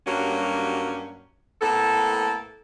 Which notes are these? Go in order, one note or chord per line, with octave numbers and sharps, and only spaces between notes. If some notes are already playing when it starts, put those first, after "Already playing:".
G2 F#3 G3 A#3 C#4 F#4
A2 A#3 B3 A4